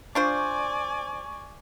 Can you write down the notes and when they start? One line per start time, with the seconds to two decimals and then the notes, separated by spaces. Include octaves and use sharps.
0.15 D4 F4 C5 D5 G#5 C#6